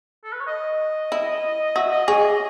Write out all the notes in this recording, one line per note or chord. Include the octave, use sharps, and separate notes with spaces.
A4
B4
C#5
D#5
E4
F#4 E5
D#5
G#4 C#5
D#5